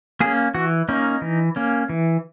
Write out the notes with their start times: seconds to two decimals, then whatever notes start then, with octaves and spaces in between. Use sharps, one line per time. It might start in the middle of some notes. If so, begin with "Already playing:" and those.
0.20 A#3 C#4 G#4
0.54 E3 F#4
0.89 A#3 C#4 D#4
1.22 E3
1.56 A#3 C#4
1.89 E3